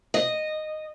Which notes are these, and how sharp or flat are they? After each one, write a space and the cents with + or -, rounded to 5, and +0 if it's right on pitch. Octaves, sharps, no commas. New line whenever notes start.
D#5 -10